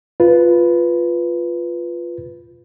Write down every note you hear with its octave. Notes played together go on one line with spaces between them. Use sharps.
F4 B4